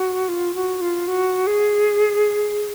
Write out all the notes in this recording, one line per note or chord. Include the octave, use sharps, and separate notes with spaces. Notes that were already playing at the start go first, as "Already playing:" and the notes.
Already playing: F#4
F4
F#4
F4
F#4
G#4